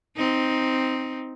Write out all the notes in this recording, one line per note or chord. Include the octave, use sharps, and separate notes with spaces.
C4 D#4